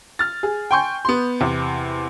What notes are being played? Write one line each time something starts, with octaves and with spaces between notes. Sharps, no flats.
F6 A6
G#4
G5 G#5 C6 C#6 G6
B3 C6
E2 C3